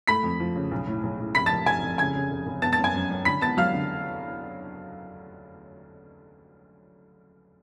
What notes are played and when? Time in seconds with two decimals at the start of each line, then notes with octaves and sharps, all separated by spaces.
0.07 A3 B5 B6
0.24 F2
0.40 F3
0.56 C#3
0.71 B1
0.87 A2
1.03 B1
1.19 A2
1.35 F1 B5 B6
1.46 A5 A6
1.51 F1
1.66 F1 G#5 G#6
1.83 F1
1.98 C#3 G#5 G#6
2.15 C#3
2.31 F1
2.46 F1
2.62 B3 A5 A6
2.72 A5 A6
2.78 F#2
2.84 G#5 G#6
2.95 F#2
3.10 F#2
3.25 D3 B5 B6
3.41 B3 A5 A6
3.57 F#3 F5 F6
3.73 D3